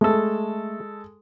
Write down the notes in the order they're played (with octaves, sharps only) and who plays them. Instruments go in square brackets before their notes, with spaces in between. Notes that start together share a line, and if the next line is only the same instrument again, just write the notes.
[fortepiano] G#3 A4 [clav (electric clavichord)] A3